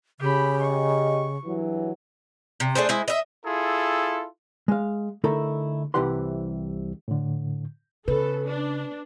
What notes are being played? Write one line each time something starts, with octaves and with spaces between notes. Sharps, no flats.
C#3 G4 B5
G4 D#5 C#6
G2 E3 F#3
C3
A3 D4 G#4 C5
G#3 E4 C5
D#5 E5
E4 F4 G#4 A4
G#3 F5
D3 A3 D#4 E4 A4 A#4
C2 C3 E3 G4 F#5 C6
A2 D3
C#3 A4 B4
D4